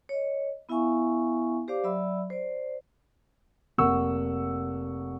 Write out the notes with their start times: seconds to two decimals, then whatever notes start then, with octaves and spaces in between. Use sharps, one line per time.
0.09 C#5 D#5
0.69 B3 E4 E5 F5 G#5 C#6
1.68 G4 C5 D5 F5 D6
1.84 F#3 D5 E5 B5 E6
2.30 C5 D5
3.78 F1 A#3 F#5 C#6 E6